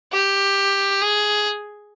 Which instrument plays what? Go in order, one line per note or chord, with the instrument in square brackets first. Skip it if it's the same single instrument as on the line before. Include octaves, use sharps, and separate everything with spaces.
[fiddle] G4
G#4